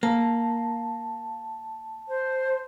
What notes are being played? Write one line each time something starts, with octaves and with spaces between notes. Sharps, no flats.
A#3 A5
C5